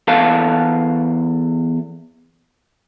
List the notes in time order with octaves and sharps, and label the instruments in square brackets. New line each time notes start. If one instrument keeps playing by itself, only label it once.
[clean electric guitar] E2 A4 B4 F5 A5